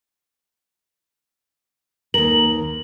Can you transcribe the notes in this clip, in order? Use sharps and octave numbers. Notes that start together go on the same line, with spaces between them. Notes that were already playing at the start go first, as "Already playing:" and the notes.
D#2 A#4 F#7